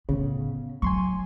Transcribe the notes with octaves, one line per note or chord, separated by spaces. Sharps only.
A2 C#3 B3
F#3 G#5 C6 C#6